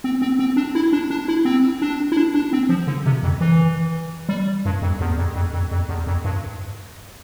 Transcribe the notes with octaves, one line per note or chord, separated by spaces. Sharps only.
C4
C4
C4
D4
E4
D4
D4
E4
C4
D4
E4
D4
D4
C4
F3
D3
C3
F2
E3
G3
G2
F2
E2
F2
F2
F2
F2
E2
F2
G2